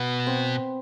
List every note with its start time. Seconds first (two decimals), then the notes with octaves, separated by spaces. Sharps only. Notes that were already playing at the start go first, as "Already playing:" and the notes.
Already playing: B2 B3
0.27 C4